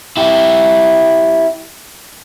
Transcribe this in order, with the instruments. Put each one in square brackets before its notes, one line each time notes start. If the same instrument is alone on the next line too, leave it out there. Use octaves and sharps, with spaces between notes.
[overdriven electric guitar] E4 G4